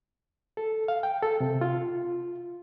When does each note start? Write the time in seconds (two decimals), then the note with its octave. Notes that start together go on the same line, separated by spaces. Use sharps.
0.57 A4
0.88 F5
1.03 G5
1.22 A4
1.40 C3
1.61 F4